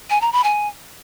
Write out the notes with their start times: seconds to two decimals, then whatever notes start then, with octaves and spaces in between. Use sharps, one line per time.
0.10 G#5
0.21 A#5
0.33 B5
0.44 G#5